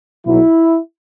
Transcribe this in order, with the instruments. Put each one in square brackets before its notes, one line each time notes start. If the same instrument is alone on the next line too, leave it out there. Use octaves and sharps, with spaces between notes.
[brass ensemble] B1 B2 F#3 E4